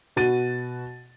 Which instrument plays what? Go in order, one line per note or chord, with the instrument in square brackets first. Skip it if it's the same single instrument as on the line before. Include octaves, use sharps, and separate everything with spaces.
[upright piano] B2 F#4 A6 D#7